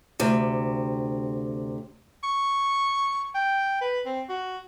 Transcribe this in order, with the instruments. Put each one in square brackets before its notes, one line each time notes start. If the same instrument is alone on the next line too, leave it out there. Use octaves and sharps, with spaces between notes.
[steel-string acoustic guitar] D2 C3
[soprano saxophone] C#6
G5
B4
C4
F#4